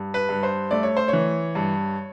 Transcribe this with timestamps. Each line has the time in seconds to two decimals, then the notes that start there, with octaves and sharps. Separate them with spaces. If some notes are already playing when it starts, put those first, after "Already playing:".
Already playing: G2
0.14 B4
0.29 G2
0.43 C5
0.71 A3 D5
0.83 C#5
0.97 C5
1.08 E3 C#5
1.55 G2